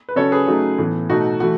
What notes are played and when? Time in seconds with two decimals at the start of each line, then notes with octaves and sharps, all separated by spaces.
0.09 B4
0.16 C#3 F#3 C#4 A4 C#5
0.32 G#4 B4
0.47 C#3 F#3 A3 D#4
0.78 A2 E3 B3
1.10 B2 A3 D#4 F#4
1.40 E3 A3 F#4